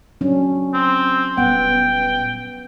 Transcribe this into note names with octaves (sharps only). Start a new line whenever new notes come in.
F#3 C#4 D4
C4
D#1 B3 F#5 G5